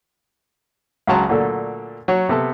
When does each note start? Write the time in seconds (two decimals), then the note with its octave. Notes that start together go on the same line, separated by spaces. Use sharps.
1.07 C#2 C#3 F#3 A5 A#5 C6
1.29 A#2 D3 F#3 A3 A4
2.08 F#3 C#5
2.29 C3 B3 A4 A5